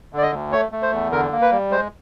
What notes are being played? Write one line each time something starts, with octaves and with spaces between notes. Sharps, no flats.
D3
D5
D#5
D2
A3 C#5
A3
C5
E2
D3 A#4
A#3
B4
G3
G#3 C5